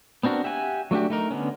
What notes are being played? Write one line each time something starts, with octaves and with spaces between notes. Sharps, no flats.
B3 C4 D4 F#4 A#4
G4 E5 F#5 G#5
F#3 A3 D4 F#4 G4
A3 D#4 A#4
D3 B3 C#4